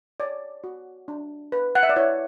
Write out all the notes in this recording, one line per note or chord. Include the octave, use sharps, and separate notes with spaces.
C#5 D5
F#4
D4
B4
F#5
E5
D5
E4 C#5